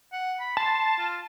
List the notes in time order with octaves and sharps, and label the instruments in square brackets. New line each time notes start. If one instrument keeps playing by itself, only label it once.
[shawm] F#5
B5
[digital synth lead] A5 [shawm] C6
[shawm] F4